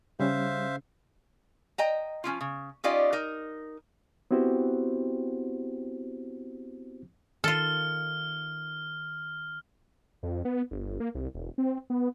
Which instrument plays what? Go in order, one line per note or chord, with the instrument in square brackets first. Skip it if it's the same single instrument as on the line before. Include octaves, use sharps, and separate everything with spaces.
[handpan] C#3 [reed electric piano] G3 C#4 [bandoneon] C5 E5 F5
[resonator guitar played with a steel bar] D#5 G5 A#5
F3 C#4 E4 F4
C#3
C#4 D#4 F4 G4 D5 D#5
D#4 A#4
[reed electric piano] B3 C4 E4 F#4 G4 C5
[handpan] D#3 [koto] F4 A4 [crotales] F6
[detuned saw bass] F2
B3
G1
A#3
C2
E1
C4
B3